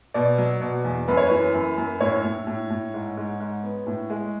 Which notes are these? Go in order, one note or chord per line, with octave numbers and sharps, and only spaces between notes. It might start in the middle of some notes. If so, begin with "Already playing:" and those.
B2 D5
F#3
B2
E2
F#2 B4
C#5
E3 B4
F#2
F#2
A2 C#5
A2
A2
A2
G#2
G#2
G#2
B3
A2
G#3